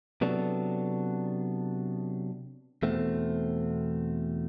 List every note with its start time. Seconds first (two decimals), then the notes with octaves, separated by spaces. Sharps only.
0.21 C3 F#3 B3 D4 A4
2.83 E2 B2 A3 C4